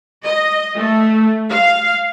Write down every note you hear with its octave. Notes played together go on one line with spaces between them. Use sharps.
D#5
A3
F5